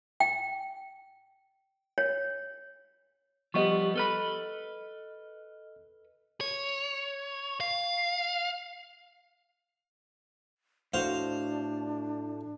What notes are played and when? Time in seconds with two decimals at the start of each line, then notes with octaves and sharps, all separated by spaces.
0.20 G5
1.98 C#5
3.54 F3 G3 B3 G4 D#5 C#6
3.96 A4 B4 D#5 B5 F6
6.41 C#5
7.60 F5
10.94 A2 D4 F#4 C5 F5